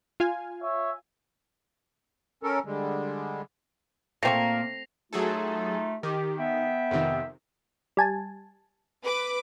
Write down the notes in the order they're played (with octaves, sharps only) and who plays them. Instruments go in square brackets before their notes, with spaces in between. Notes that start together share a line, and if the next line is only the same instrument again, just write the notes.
[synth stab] F4 F5 G#5
[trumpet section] C#5 E5
[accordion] C#4 A4 A#4
D3 G3 G#3
[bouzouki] A#2 A#3 [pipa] A3 C4 C#6 [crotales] A#6 C7 F7
[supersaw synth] F#3 G#4 A4 [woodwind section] A3 D#4 F4
[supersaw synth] D#3 [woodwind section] G4
[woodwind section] B3 E5 G5
[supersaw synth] F2 C3 D#3
[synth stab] G3 G#5 A5
[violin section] B4 D6